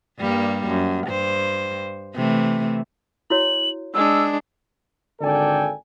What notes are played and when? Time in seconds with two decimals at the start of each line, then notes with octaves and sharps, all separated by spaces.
0.19 G2 G3 A#3
0.68 F#2
1.07 G2 C5
2.15 C3 E3 A3
3.30 E4 F#4 C#5 F#7
3.94 G#3 D4 E6
5.21 G#1 D3 A4 D5 G5 G#5